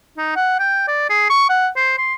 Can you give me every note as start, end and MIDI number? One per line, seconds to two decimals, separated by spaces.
0.17 0.31 63
0.36 0.56 78
0.59 0.87 79
0.88 1.08 74
1.09 1.26 68
1.30 1.49 85
1.49 1.68 78
1.76 1.94 72
1.98 2.14 84